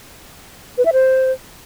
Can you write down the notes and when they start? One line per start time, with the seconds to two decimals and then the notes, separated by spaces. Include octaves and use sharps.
0.78 B4
0.85 E5
0.93 C5